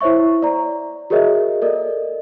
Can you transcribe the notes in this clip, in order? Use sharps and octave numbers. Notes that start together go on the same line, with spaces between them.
E4 C5 C#5 E5 C#6
D5 A#5
F#4 G#4 A#4 C#5 D#5 E5
A4 A#4 D5 D#5